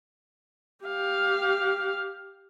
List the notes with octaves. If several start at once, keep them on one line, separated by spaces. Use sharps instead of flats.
G4 F5